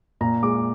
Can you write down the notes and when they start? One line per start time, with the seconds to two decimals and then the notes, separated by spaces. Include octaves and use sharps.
0.21 A#2 A#5
0.43 G#3 D6